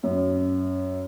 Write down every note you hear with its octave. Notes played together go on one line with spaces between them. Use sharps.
F#2